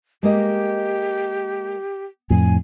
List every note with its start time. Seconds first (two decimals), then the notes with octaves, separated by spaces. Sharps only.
0.23 G#3 A#3 G4 D#5
2.30 F2 A2 G#5